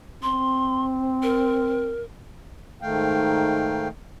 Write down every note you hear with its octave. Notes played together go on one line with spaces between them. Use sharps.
C4 C6
A#4
G#2 D#3 A3 F5 G5